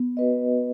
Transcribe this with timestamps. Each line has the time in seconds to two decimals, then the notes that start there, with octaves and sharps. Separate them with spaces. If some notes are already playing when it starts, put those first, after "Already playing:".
Already playing: B3
0.17 F#4 B4 D#5